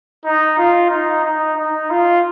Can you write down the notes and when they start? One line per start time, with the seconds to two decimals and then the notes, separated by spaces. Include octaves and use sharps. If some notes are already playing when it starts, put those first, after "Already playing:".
0.25 D#4
0.58 F4
0.90 D#4
1.24 D#4
1.57 D#4
1.90 F4